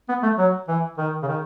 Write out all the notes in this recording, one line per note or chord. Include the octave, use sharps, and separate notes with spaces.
B3
A3
F#3
E3
D#3
C#3
D#3